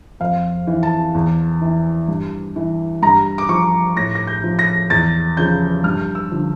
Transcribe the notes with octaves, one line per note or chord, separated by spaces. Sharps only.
F2 F5
E3
A5
E2
E3
G2
E3
G2 A#5
D6
F3 C#6
A2 A#6
A#6
G6
F3
A#6
E2 A6
C#3 F3 G6
G2 F6
E6
D3 F3